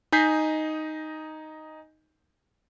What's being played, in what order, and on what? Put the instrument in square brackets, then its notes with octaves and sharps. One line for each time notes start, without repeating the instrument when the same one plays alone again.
[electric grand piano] D#4 D#5 G#5 G6 B6 C7